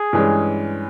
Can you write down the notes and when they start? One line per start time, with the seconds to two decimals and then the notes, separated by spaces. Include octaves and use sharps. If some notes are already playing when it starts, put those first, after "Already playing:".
Already playing: G#4
0.13 G2 E3 G#3 C#4